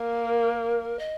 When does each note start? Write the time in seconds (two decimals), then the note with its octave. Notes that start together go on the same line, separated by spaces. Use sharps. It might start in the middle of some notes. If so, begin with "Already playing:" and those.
Already playing: A#3 A#4
0.99 D#5